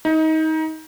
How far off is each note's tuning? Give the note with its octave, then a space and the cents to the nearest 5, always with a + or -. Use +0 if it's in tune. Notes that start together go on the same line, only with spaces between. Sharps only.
D#4 +25